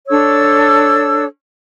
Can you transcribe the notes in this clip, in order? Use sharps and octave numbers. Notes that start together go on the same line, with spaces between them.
D4 A4 C#5 E6